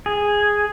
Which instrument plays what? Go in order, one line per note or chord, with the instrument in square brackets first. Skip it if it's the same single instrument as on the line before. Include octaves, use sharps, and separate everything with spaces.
[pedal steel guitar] G#4